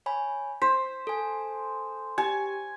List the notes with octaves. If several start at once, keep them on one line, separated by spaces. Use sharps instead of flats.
C#5 G#5 B5
C5 B6
A4 G#5
G4 G#5